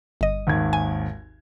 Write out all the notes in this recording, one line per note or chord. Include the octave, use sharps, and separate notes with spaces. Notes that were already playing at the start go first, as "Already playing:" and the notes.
G1 D#5
G#1 D#2 G#6
G#5